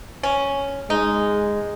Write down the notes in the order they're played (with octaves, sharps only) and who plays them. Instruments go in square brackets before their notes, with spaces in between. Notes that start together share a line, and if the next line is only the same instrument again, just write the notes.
[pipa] C#4
[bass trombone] G#3 [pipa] D#4